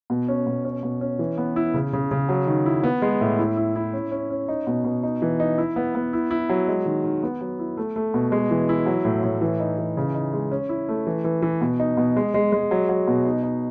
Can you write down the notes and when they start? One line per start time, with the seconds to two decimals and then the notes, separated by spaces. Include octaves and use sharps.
0.10 B2
0.28 C#4
0.47 B2
0.65 C#4
0.83 B2
1.01 C#4
1.19 E3
1.38 B3
1.56 E4
1.74 C#3
1.93 C#3
2.11 C#3
2.29 F#3
2.47 D#3
2.66 E4
2.83 B3
3.02 G#3
3.21 A2
3.39 E4
3.57 E4
3.76 E4
3.93 C#4
4.12 C#4
4.30 C#4
4.48 D#4
4.67 B2
4.84 B2
5.03 D#4
5.22 E3
5.40 D#4
5.58 E4
5.76 B3
5.95 B3
6.13 E4
6.31 E4
6.49 F#3
6.68 G#3
6.86 D#3
7.04 D#3
7.23 B3
7.41 F#3
7.59 E4
7.77 A3
7.96 A3
8.14 B2
8.32 G#3
8.51 E3
8.69 E4
8.86 F#3
9.05 A2
9.23 A2
9.41 E3
9.60 D#4
9.78 E3
9.97 C#3
10.14 D#4
10.33 G#3
10.51 C#4
10.69 E4
10.88 A3
11.07 E3
11.24 E3
11.42 E3
11.61 B2
11.80 D#4
11.97 B2
12.16 G#3
12.34 G#3
12.52 G#3
12.71 F#3
12.89 F#3
13.08 B2
13.25 D#4
13.43 D#4